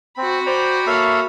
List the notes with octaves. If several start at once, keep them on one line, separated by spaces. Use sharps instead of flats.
C4 F#4 B5
C5 D5 G5 A#5
A#3 A4 C#5 E5 F5